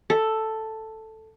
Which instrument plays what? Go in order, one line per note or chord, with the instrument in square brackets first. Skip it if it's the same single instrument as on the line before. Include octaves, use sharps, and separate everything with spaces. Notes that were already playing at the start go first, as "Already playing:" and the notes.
[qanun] A4